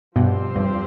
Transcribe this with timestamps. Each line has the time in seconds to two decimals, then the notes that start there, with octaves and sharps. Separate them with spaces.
0.16 G2 B2 F3 C4 G4 C5
0.55 E2 G2